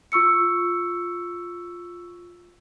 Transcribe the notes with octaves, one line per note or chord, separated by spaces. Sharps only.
F4 C#6 E6 C#7